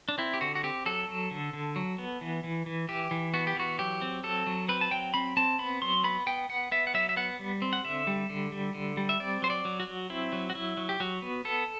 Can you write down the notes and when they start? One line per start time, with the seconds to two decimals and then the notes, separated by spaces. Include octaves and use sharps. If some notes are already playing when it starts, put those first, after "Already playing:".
0.09 D4
0.18 C4 E4
0.34 G4
0.41 D3 F#4
0.55 F#4
0.63 C4 G4
0.86 F#3 A4
1.08 F#3
1.31 D3
1.53 D3
1.76 F#3
1.98 B3
2.21 E3
2.44 E3
2.66 E3
2.89 E3 G4
3.11 E3
3.34 B3 F#4
3.47 G4
3.56 E3 F#4
3.79 F#3 G4
4.02 C4
4.23 F#3 A4
4.47 F#3
4.69 C4 B4
4.81 A5
4.91 F#3 G5
5.14 C4 B5
5.37 C4 A5
5.59 B3 B5
5.82 F#3 C6
6.04 B3 B5
6.27 B3 G5
6.49 B3 F#5
6.72 B3 E5
6.87 F#5
6.94 F#3 E5
7.09 E5
7.16 B3 F#5
7.39 G3
7.62 C4
7.73 F#5
7.84 D3 E5
8.07 G3
8.30 D3
8.52 G3
8.74 D3
8.97 G3
9.09 E5
9.20 C4 D5
9.42 F#3 C5
9.50 D5
9.65 F#3
9.80 F#4
9.87 F#3
10.10 C4 E4
10.33 F#3
10.50 F#4
10.55 F#3 E4
10.77 F#3
10.89 G4
11.00 F#3 F#4
11.22 B3
11.45 B3 A4